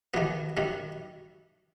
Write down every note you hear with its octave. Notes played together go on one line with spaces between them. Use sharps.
D#2 D#3 F#3 B3
F#2 D#3 G3